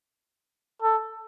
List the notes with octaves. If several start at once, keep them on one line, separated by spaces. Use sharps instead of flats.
A4